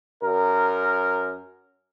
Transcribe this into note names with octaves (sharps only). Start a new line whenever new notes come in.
F#2 A#4